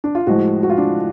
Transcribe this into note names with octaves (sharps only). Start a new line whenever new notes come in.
D4
F4
A2 F3 G#3 F#4
F#4
F4
D4